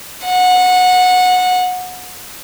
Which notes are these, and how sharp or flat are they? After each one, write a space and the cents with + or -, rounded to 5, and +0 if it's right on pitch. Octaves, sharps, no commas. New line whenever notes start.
F#5 -20